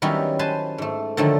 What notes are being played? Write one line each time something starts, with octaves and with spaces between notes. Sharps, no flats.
D#3 F#3 G3 B3 C#4 E4
B4 C5 G#5 A5
G#2 A3
D3 D#3 F3 F#3 A3